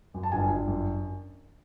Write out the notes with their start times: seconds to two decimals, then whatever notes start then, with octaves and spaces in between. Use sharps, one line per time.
0.14 F#2
0.23 A5
0.32 G1 G#5
0.50 G1
0.67 F#2